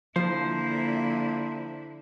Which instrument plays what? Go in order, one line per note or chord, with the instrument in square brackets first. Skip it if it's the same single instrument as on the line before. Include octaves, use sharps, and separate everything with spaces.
[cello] D3 E4 [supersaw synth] F3 [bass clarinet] A#3 [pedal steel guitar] C5